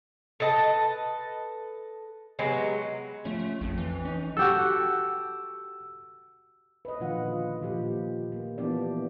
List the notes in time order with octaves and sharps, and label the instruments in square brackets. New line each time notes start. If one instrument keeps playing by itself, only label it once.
[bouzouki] A4 B4 D#5 A5
C3 F#3 G#3 B3
[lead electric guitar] F3 C#4 [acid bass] A3
[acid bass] A3
[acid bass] A#1 [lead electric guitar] F2
[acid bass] E3
[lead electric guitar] C#4 D#4
[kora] F#4 G4 A4 [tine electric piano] E6
[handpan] B4 D#5
A#2 D3 D#3 F3 F4 F#5
A#2 F3 G4
A#3
E3 F3 B3 D4 G4 D5